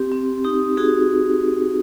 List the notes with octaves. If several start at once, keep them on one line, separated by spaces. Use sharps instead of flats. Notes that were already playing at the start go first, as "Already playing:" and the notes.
Already playing: C4 G4
C4
D#4 G4
D#4 F#4 G#4